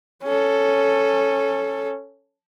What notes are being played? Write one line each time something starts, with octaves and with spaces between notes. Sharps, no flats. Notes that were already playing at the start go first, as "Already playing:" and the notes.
C#4 A4